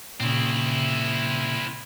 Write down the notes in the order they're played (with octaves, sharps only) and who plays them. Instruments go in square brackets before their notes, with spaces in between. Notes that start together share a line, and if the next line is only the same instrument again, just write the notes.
[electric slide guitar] A#2 C#3 [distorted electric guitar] C4 E4